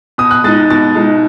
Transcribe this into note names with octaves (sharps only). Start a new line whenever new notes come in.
B2 D#6
F#6
G#3 D#4 A6
B2 A6
G#3 D#4